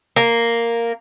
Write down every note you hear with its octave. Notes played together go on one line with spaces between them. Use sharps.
A#3